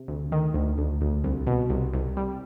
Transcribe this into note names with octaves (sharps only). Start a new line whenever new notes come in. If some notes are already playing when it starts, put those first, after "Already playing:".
Already playing: C3
D2
D#3
D2
D2
D2
C2
B2
C2
C2
G3